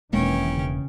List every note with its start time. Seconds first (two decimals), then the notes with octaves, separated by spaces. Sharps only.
0.13 E1 B2 D#3 E3 G#3 A#3 C#4 G5
0.48 C#3